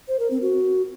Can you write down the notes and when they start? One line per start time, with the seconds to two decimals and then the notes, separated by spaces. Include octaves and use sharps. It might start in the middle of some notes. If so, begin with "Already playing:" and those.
0.08 C5
0.19 A#4
0.30 C4
0.42 F#4